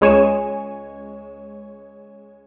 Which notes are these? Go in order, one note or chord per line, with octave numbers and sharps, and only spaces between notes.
C#2 G#3 C#5 G#5 E7